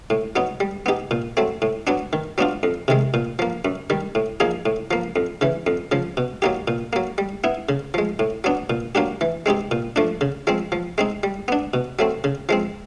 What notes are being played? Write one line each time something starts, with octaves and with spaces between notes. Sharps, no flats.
A2
F#3 B3 D#4
G3
B3 D#4 G4
A#2
F#3 A3 C4
A2
F#3 B3 D4
D#3
F#3 B3 D4 F4
F2
C3 D#3 G#3
A#2
F3 A#3
F#2
D#3 G3
A2
F3 A#3 D#4 G#4
A2
F3 A#3
F2
C#3 E3
F2
C#3 F3
B2
F#3 A#3 D#4 G4
A#2
F#3 A#3
G3
B3 E4
C#3
F3 G#3
A2
F#3 B3 D4
A#2
F#3 A#3 D4 G4
E3
G#3 C4 D#4 G4
A#2
F3 A3 D4
C#3
F3 G#3 C4
F3
G#3 C4 D#4
G3
B3 D4
B2
F#3 A3 C4
C#3
F3 G#3 C4